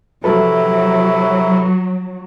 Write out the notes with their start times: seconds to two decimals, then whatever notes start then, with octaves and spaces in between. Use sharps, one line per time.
0.24 C3 F3 F#3 E4 F#4 A4 B4